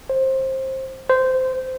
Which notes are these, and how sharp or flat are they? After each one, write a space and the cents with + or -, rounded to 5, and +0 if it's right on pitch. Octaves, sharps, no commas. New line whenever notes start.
C5 +20
C5 -15